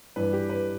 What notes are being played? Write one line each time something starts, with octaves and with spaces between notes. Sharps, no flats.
G2 E3 G3 B4
G4
B4